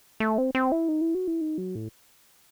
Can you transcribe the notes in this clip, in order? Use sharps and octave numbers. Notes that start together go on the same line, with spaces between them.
A3
C4
C4
E4
D#4
E4
F#4
E4
D#4
F#3
A2